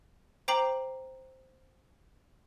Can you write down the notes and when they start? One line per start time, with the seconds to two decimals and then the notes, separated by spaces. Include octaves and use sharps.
0.48 C5 G5 A#5 D6 C7 F#7